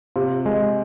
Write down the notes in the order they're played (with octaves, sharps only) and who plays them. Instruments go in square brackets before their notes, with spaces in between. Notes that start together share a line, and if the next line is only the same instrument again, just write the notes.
[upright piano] C3 [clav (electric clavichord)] F4
[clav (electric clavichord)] G#3